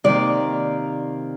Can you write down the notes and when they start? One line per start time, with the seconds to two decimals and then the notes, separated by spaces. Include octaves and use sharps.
0.04 C3 D#3 A#3 D5